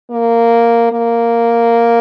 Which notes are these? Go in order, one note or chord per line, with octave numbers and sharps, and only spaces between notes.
A#3
A#3